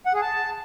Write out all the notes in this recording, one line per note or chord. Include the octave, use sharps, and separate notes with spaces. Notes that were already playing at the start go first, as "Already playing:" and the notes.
F#5
G#4
A5